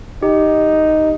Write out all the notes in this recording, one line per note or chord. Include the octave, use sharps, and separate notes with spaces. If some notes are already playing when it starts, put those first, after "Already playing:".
D#4 G4